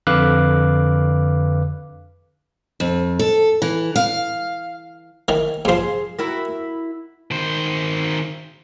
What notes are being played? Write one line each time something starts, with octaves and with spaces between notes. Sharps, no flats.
F2 D3 B4 F5 D6 F#6
F2
A4
E3
F5
D#3 E3
G2 F3 G#4 C5
E4 F#4 A#4
D#3 C5